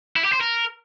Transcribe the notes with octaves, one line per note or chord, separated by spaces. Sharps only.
E4
G4
C5
A#4